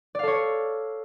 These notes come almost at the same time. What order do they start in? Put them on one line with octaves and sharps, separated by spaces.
D5 F5 A4 C#5